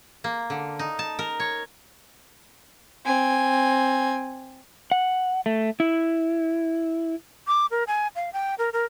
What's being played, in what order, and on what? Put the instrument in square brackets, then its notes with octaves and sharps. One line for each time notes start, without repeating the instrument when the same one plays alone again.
[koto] A#3
D3
D#4
A5
A#4
C#5
[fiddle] C4 G#5
[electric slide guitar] F#5
A3
E4
[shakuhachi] D6
A#4
G#5
F5
G5
A#4
A#4